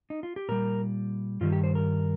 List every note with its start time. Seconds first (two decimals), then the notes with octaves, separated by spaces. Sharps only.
0.10 D#4
0.23 F4
0.36 G4
0.49 A#2 G3 A#4
1.41 G2 D#3 G3 F4
1.52 G4
1.64 C5
1.75 A#4